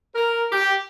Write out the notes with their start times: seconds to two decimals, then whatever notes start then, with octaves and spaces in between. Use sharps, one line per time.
0.15 A#4
0.52 G4